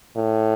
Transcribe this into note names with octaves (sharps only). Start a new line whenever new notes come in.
A2